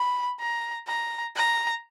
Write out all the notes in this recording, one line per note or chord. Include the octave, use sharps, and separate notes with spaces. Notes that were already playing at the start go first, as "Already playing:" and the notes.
Already playing: B5
A#5
A#5
A#5